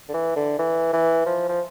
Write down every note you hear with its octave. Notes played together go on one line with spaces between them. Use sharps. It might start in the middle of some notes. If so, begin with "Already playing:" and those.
D3
E3
D3
E3
E3
F3
F3